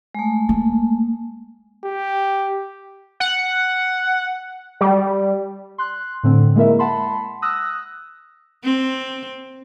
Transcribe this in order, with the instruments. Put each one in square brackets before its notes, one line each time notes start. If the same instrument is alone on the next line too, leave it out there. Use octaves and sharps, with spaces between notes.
[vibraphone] G#3 A3
[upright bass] A#3
[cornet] G4
[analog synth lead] F#5
G3
[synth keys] C6 F#6
A2 D3 C4
G#3 A#3 E4 A#4 E5
F#5 A5 B5 C6
D#6 E6 F#6 A#6
[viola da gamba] C4